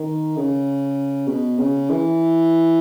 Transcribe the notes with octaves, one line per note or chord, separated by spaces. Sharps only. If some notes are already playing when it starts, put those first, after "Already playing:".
Already playing: D#3
C#3
B2
C#3
E3